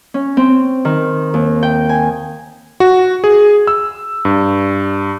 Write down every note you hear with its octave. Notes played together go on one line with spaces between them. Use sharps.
C#4
C4
D#3
D#2
G5
G#5
F#4
G#4
E6
G2